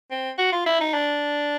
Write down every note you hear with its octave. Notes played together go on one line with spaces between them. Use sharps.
C4
F#4
F4
E4
D#4
D4